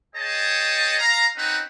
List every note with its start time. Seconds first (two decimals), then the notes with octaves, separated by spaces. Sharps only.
0.15 G#4 C#5 D#5 G5 A5
0.99 F5 A#5
1.36 C4 C#4 D#4 F#4 B4